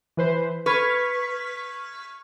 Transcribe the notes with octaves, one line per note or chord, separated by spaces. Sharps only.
E3 B4 C5
B4 C#6 F6 G#6